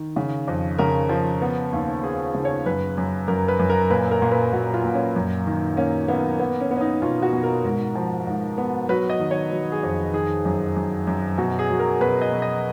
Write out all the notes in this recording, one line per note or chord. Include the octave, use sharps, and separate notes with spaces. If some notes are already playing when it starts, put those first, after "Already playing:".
Already playing: D#3
C#3
F2
C#3 A#4
F3
B3
D#2
B3 G#4
C#3
C#5
F#2 B4
F#2
F#2 A#4
B4
F#2
A#4
A#2 B4
A#4
A#2
B4
A#2 F#4
F4
A#2
C#4
F#2
D#3
A#3 C#4
A#3 B3
B3
C#4
B3
C#4
D#4
B2 F4
F#4
B2
A#4
G#2
F3
G#2
B3
F#3 B4
D#5
D#3
C#5
F#3
G#4
F2
D#3 G#4
F#2
F#2
F#2
B2 F#4
G#4
F#3
A#4
B2 B4
D#5
B2
D#5